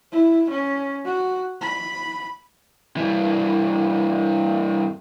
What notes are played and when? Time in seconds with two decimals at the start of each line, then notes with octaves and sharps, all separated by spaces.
0.12 E4
0.50 C#4
1.05 F#4
1.61 B5
2.97 G2 E3